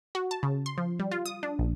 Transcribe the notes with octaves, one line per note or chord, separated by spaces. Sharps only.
F#4
A5
C#3
C6
F3
G3
F4
D#6
D4
A#1